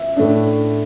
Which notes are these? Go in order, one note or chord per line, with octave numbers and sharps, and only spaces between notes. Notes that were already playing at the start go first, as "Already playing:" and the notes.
Already playing: E5
A2 A3 D4